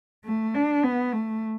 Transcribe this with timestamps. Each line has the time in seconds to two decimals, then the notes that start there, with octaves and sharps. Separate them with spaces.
0.25 A3
0.54 D4
0.83 B3
1.12 A3